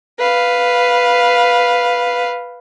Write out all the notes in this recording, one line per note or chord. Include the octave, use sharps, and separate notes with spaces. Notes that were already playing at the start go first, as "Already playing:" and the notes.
B4 F5